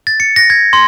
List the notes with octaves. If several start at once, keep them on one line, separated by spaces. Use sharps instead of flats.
A6
C#7
A#6
G#6
C6